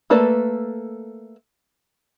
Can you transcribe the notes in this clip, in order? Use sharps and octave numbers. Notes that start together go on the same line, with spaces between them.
A3 A#3 A4 B4 D5